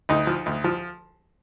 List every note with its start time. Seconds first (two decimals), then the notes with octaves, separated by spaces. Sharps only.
0.09 D2 D#4
0.27 F3
0.46 D2
0.64 F3